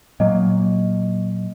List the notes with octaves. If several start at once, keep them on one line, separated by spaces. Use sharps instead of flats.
A#2 F#3 A#3 D#5